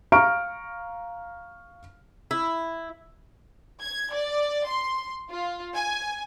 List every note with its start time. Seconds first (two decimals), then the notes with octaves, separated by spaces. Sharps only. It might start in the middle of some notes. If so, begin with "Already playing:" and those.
0.12 F5 A#5 C#6 F6 D7
2.31 E4
3.81 G#6
4.13 D5
4.67 C6
5.30 F4
5.74 G#5